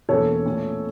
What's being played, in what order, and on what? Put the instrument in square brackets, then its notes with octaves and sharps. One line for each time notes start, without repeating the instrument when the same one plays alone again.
[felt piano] E1 E2 E3 A#3 C#4 [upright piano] A4 C#5
[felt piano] A#2 A3 C#4